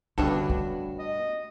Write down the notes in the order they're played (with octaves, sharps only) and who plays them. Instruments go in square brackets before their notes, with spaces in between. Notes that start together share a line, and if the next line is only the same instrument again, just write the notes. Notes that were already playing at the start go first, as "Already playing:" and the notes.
[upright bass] D2 [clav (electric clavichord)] G2 B2 A4 [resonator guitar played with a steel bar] C#4 D4 F#4
[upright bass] A3
[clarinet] D#5